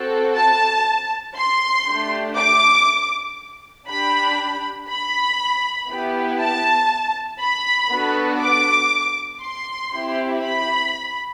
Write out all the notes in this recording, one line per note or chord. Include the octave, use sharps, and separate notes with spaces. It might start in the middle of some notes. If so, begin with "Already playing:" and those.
Already playing: C4 F#4 A4
A5
C6
A3 D4 G4
D6
D4 G4 B5
B5
B3 E4 G4
A5
B5
B3 D4 F#4 A4
D6
C6
C4 E4 G4
B5